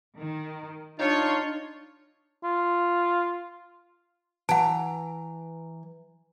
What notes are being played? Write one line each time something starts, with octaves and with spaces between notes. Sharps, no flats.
D#3
D4 D#4 F4 C#5
F4
E3 F#5 A5 A#5